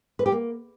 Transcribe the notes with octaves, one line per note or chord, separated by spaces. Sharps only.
B4
G4
A#3